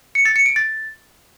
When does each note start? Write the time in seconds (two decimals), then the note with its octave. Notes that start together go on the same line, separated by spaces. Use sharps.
0.15 C#7
0.25 A6
0.36 C#7
0.46 D7
0.56 A6